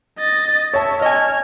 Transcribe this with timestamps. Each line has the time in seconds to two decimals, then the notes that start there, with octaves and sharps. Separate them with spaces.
0.19 D#5 A6
0.74 C#5 E5 A5
1.02 D#5 G#5 F6 G#6